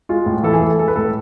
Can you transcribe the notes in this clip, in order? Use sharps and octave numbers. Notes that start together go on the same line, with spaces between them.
G#3 F4
A2
E3 A4
G#4
A2 A4
G#3 A4
B4
A2 A4